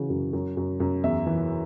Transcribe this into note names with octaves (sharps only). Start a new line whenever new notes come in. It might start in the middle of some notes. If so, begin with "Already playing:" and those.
Already playing: C#3 E3 F#4
F#2
F#2
F#2
F#2
E2 E5
E3